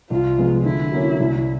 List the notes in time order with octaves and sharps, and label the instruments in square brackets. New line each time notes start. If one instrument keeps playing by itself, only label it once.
[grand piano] C2 [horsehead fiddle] F4
[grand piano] C3 F3 G#3 B3
[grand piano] D3 [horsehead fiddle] E4
[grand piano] F#3 A#3 C#4
C2